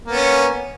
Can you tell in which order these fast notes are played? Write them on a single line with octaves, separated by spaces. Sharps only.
A#3 B3 C#4